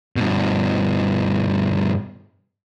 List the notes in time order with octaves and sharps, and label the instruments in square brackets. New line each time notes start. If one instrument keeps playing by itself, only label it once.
[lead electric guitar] G2 B2